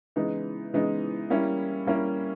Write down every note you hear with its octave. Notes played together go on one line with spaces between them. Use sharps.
C#3 E3 G#3 B3 D#4
C#3 E3 G#3 B3 D#4
G3 A#3 C#4 E4
G3 A#3 C#4 E4